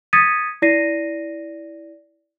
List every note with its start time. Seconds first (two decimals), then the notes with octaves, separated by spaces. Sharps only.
0.13 D#6 G#6 A6 B6 C#7 D#7
0.62 E4 D5 A#6 C7 D#7